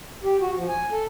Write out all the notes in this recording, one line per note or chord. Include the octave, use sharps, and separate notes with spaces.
G4
F#4
F3
G#5
A4